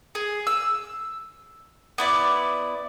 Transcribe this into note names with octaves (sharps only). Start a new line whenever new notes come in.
G#4
E6
B3 E4 D5